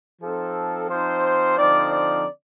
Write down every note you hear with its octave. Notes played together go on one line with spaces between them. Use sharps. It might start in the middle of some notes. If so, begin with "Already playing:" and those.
F3 C4 D#4 A4
F3 C4 D#4 C5
D3 F3 C4 D#4 D5
D5